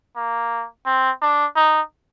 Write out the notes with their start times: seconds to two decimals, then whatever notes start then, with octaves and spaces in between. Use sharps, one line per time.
0.16 A#3
0.86 C4
1.22 D4
1.56 D#4